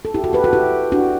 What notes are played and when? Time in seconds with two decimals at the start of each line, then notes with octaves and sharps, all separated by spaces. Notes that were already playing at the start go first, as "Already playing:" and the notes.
0.05 A4
0.14 E4 G4
0.24 F#4 A4
0.33 G4 B4
0.44 F#4 A4
0.53 E4 G4
0.92 D4 F#4